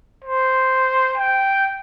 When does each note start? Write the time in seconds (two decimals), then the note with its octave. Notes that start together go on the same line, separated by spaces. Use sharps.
0.24 C5
1.17 G5